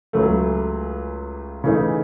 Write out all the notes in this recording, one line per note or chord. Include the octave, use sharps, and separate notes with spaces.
C#2 C#3 F#3 A3
C#3 E3 A3 D#4